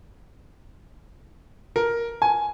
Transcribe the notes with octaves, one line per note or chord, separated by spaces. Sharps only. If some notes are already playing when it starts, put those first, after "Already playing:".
A#4
G#5